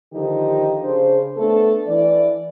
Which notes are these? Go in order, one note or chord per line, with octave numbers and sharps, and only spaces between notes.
D3 D#3 F3 D#4 G4
C#3 D4 C5
A3 B3 D4 A4
E3 D5